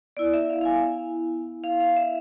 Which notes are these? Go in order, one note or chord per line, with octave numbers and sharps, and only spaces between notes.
B3 E4 D5
E5
F5
F5
G#5
F5
F5
E5